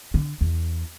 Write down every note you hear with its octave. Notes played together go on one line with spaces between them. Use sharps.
D3
E2